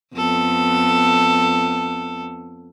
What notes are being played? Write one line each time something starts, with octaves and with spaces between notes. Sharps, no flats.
F2 B3 A4